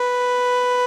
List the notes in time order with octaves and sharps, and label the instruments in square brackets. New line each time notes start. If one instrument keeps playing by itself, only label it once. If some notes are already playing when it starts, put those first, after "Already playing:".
Already playing: [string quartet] B4